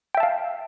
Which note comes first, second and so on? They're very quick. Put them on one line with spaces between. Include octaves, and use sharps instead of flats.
G5 E5 A5 F5